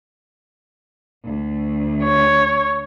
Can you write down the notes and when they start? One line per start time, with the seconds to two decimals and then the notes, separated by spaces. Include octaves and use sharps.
1.24 D2
2.04 C#5